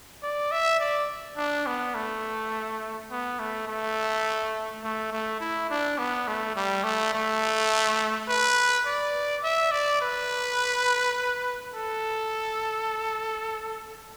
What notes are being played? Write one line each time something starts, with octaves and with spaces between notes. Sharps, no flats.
D5
E5
D5
D4
B3
A3
B3
A3
A3
A3
A3
E4
D4
B3
A3
G3
A3
A3
B4
D5
E5
D5
B4
A4